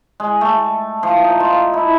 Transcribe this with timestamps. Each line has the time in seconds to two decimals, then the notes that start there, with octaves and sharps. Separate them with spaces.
0.20 G#3
0.41 A3
1.03 F3
1.24 D#4
1.40 F4
1.74 E4